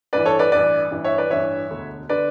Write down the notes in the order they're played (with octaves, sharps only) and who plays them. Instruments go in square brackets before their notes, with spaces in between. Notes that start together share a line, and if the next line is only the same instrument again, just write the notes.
[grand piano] A1 G2 E3 B4 D5
A4 C#5
B4 D5
A1 G2 E3 B4 D5
A1 G2 E3
C#5 E5
B4 D5
A1 G2 E3 C#5 E5
E1 D2 D3
D3 B4 D5